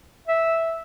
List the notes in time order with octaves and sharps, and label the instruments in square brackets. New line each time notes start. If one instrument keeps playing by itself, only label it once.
[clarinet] E5